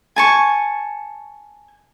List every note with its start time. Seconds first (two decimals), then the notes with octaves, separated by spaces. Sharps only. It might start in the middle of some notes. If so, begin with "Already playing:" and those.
0.16 G#5 A5 C#6